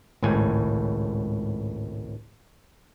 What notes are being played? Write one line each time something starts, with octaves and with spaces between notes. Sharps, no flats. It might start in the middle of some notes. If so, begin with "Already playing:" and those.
G#1 C#2 A2 G#5